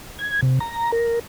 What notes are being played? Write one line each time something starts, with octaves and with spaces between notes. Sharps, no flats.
G#6
C3
A#5
A#4